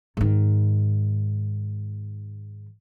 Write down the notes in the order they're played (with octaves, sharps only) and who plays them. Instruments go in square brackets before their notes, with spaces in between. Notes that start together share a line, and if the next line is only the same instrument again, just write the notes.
[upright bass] G#2 D#3